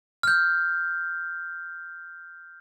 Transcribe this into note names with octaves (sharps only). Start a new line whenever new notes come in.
F6 G6